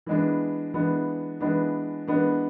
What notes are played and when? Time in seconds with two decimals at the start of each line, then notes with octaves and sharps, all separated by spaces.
0.06 E3 G#3 B3 D4
0.74 E3 G#3 B3 D4
1.41 E3 G#3 B3 D4
2.08 E3 G#3 B3 D4